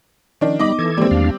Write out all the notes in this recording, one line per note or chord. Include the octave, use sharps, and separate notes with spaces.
D#3 F3 C#4 D4
G3 B3 D#4 D#5 B5 D6
E3 A4 G#6
D#3 G3 G#3 A#3 C4
E2 D4 F5